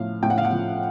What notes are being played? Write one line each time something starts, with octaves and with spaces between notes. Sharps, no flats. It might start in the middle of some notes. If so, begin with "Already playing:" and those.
Already playing: A2 F3 F5
A2 G5
F#5
F5
F#5
F3